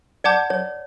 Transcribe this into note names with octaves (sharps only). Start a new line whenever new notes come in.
D5 F#5 A5 D6 G6
C#5